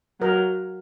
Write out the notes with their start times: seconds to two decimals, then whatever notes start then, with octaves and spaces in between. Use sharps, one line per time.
0.21 F#3 A#4